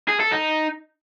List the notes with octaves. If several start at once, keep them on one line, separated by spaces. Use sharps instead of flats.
G#4
A4
D#4